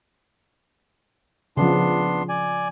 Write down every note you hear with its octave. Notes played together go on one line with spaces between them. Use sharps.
C#3 F3 B3 D4 C6
D5 G#5